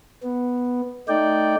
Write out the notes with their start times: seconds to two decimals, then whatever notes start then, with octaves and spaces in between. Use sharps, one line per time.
0.23 B3
1.08 A3 D#4 D5 G5